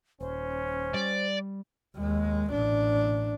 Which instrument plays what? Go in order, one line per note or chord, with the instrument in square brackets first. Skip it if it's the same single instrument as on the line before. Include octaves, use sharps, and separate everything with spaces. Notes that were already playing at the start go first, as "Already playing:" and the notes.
[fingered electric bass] D#1 [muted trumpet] C#4 [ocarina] C5
[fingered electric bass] G3 [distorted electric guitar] D5
[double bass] D#2 G#3
A1 D4